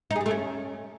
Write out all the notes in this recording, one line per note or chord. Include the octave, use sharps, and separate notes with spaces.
D#4
G#4
G3
A3
C#4